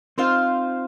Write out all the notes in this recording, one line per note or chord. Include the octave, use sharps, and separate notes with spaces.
C4 D#4 F4 C5 F5